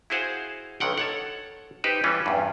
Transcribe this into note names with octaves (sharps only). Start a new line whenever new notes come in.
E4 F#4 G#4 C5 F5 F#5
B1 D3 D#3 F#5 G5
A4 C#5 F#5
D#4 G4 B4 C5
E3 G3 C#4 F4 B4
E2 G2